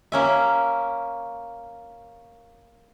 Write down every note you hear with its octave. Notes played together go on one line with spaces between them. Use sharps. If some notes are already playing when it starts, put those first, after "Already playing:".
A#3 C#4 E5